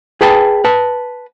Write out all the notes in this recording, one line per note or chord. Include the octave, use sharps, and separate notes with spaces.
G#4 B4 G5 A5
B4 A5